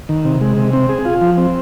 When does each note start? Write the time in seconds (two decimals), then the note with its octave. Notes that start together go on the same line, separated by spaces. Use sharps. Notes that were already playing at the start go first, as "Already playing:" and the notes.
0.09 D#3
0.25 C3
0.41 G#3
0.57 C3
0.73 C4
0.89 G#4
1.05 F4
1.21 F3
1.37 C4